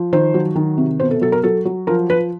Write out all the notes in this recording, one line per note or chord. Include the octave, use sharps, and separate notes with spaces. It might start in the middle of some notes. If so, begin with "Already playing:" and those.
Already playing: F3
D#3 C5
F#3
D#3
C3
B2 C5
A4
F#3 A4
A#4
F#3 A4
F#3
F3 A#4
F3 B4